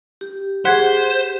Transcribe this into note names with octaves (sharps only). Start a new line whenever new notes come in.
G4
G#4 C5 F#5 F#6 G#6 B6